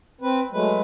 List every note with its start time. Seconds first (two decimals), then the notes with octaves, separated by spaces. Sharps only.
0.21 C4 B4
0.52 F#3 G#3 A3 B4